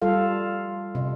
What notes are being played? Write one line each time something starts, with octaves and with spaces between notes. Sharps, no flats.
G3 F4 A4 F5
C3